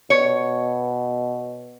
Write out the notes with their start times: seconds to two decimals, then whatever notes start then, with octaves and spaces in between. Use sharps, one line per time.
0.10 B2 C#5